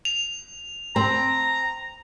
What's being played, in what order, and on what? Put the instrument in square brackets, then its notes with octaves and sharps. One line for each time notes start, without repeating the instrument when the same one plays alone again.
[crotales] F7
[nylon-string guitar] C4 [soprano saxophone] A#5